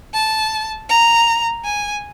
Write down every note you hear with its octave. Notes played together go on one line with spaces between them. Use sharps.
A5
A#5
G#5